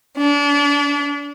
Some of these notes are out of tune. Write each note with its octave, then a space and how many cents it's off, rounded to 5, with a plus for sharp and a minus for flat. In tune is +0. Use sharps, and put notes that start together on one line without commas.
D4 -35